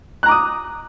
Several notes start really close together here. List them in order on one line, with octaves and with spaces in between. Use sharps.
F#6 A#5 D6 D#6